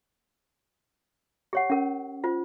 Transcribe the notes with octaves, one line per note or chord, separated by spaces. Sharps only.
G4 C#5 F#5
C#4 A#4
F4 C5